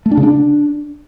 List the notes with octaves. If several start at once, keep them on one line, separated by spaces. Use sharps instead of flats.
A3
D4
C#3
D4